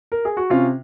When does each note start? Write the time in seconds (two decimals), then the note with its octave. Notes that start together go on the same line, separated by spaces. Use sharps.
0.12 A#4
0.25 G#4
0.37 F#4
0.50 C3 C#4 F4